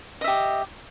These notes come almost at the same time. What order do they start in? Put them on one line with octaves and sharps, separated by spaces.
D#5 E5 G4